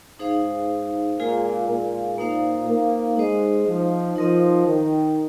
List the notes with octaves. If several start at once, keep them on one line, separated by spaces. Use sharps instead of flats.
G#2 D#4 G#4 C5 F5
A#2 G#3 F4 G#4 F5
A#2
A#2 A#3 D#4 C5 F5
A#3
G#3 D#4 C5 D#5
F3
F3 D#4 A#4 D#5
D#3